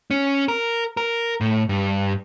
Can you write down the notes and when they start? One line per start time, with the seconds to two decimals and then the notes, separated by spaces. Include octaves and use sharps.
0.11 C#4
0.48 A#4
0.97 A#4
1.41 A2
1.69 G2